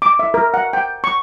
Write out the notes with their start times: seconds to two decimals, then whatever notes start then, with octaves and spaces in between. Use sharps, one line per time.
0.02 D6
0.19 E5
0.34 A#4
0.54 F#5
0.73 G5
1.04 C#6